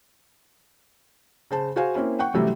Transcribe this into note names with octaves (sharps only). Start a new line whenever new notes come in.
C#3 C5 A5
F#4 G#4 C5 F5 G#5
A#3 C4 C#4 E4
F#5 G5 C#6
A1 C3 F#3 G3 A3